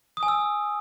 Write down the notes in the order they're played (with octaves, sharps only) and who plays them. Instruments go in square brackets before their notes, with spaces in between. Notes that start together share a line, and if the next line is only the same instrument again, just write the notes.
[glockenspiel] D#6
G#5
E6